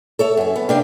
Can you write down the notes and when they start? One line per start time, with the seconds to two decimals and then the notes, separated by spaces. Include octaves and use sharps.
0.19 A4 C#5 E5
0.37 F#2 C#4
0.56 B3
0.69 C3 A#3 D4 F5 G5